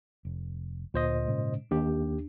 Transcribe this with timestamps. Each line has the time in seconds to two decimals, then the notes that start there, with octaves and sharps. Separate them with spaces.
0.25 F1
0.94 D2 A#2 C5 D#5
1.27 G#2 C#3 G#3
1.71 D#2 D4 G4